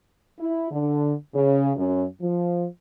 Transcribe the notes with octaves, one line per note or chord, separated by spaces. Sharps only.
E4
D3
C#3
F#2
F3